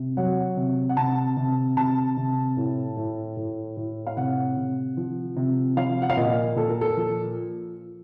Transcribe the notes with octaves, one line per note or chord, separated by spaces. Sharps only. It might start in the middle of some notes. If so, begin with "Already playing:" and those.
Already playing: C3
F#3 F#5
C3
F#5
C3 A5
C3
C3 A5
C3
A2
A2
A2
A2
F5
C3 F#5
C3
F3
C3
F3 F5
F#5
F5
A#2 D#5
A#2 A4
A#4
A4
F3